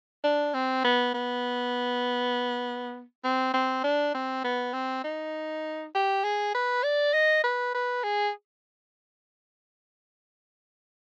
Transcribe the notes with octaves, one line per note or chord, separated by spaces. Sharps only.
D4
C4
B3
B3
C4
C4
D4
C4
B3
C4
D#4
G4
G#4
B4
D5
D#5
B4
B4
G#4